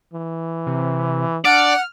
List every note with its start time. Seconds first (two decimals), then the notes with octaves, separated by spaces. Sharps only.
0.13 E3
0.66 C3
1.45 D4 D5 F#5 F6